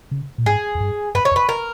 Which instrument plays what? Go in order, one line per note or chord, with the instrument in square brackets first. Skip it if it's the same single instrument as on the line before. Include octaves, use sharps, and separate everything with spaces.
[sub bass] C#3
A#2
[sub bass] G#2 [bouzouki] G#4
[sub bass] E2
G2
[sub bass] G2 [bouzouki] B4
[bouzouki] C#5
[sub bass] E2
[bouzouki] B4
A#4